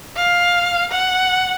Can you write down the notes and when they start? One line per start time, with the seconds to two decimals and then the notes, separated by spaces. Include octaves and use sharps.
0.16 F5
0.91 F#5